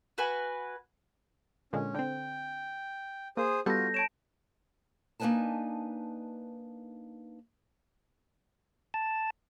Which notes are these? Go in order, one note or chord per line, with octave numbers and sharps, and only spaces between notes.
F#4 B4 G#5
A#2 D3 G#3 C#4
D3 C4 G5
A#3 G#4 C5 D#6
G3 B3 F4 F#4 A4 G6 A#6
C#5 A5 D7 E7
A#3 D4 D#4 B4 G#5 A5
A5